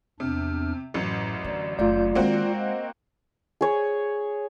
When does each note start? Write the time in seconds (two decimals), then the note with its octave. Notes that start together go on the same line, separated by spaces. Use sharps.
0.20 E2 C3 D4 F6
0.94 A1 F#2 A2
1.44 D3 D5
1.79 F#1 A3 F4 D5 G6
2.15 D#3 G#3 A#3 C4 D#4 F#4
2.59 D#5
3.61 G#4 C#5